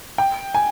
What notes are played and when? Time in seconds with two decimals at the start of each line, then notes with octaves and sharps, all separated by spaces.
0.18 G5
0.55 G#5